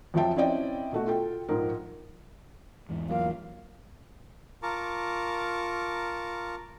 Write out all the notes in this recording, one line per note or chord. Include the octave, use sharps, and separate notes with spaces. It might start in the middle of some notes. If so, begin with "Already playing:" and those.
F2 F3 F#3 E5 G5 A5
C4 C#4 E4 D5 D#5 G5
B2 A3 F#4
F4 A4 G5
A#1 G#2 F3 A#4
E2 G#2 E3
F#3 A#3 F4 F5
F4 A#4 A5 A#5 C#6 D6